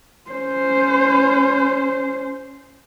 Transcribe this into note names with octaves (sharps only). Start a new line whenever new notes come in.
C#4 C5